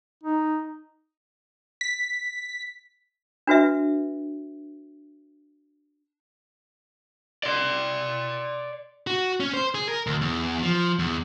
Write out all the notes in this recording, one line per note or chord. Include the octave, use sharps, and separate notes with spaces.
D#4
B6
D4 F#4 B4 E5
D5 C6
F#4
C#4
C5
G#4
A#4
D2
E2
F3
E2